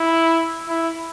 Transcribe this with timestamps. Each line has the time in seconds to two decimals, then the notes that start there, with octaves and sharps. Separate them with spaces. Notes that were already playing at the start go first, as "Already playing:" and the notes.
Already playing: E4
0.68 E4